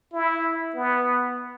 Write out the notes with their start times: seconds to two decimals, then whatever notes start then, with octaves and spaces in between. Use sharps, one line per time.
0.13 E4
0.75 B3